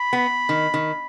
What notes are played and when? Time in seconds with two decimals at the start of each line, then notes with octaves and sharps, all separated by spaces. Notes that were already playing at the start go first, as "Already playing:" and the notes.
Already playing: B5
0.13 B3
0.49 D#3
0.74 D#3